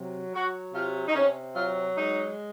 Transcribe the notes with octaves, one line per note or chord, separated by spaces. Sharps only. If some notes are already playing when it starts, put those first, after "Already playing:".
Already playing: C3 F#3
F#3 F#4
C3 F4
D#4
C3 C#4
F#3 F4
G#3 D#4